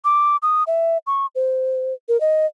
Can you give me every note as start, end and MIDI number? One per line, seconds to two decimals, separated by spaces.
0.05 0.37 86
0.42 0.64 87
0.67 0.98 76
1.07 1.26 85
1.35 1.94 72
2.09 2.20 70
2.21 2.46 75